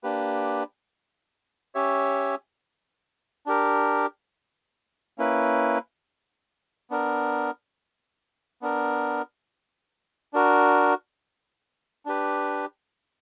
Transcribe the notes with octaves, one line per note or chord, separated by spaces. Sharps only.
A#3 D4 G4 B4
C#4 G4 C#5 E5
D4 G4 A#4
A#3 C#4 E4 B4
B3 D4 A#4
B3 D4 A#4
D4 F#4 A#4
D4 G4 B4